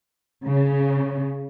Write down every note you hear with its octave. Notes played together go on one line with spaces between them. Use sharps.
C#3